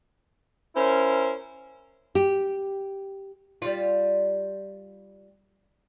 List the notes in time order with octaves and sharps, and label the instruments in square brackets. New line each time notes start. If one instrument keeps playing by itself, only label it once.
[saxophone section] C#4 E4 A#4 C5
[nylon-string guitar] G4
[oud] G3 F4